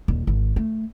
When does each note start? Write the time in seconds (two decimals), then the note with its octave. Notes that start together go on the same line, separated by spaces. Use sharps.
0.08 D#1
0.27 G#1
0.56 A3